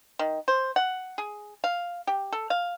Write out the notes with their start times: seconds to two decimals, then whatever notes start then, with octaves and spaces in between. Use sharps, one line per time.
0.19 D#3
0.48 C5
0.76 F#5
1.18 G#4
1.64 F5
2.07 G4
2.33 A4
2.50 F5